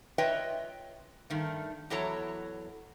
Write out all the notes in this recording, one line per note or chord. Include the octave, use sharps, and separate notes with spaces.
F4 B4 C#5 D#5 E5 G5
G2 D#3 A3
E2 F#3 E4 A4 C#5 A#5